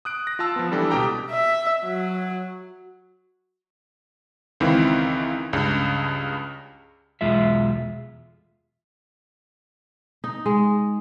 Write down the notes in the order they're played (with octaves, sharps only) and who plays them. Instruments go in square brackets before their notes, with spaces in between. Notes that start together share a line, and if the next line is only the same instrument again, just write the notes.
[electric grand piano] D#6 F#6 D7
A#6
F4 F5 A5 E6
F3 B3
E3 G3 D4 A4
C#2 B2 G4 G5 A#5
[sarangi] E5
F#3
[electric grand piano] C#2 D#3 E3 C4 E4 F5
C#2 G2 C#3
[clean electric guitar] B1 E2 G#3 F4 E5
[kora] D#4
G#3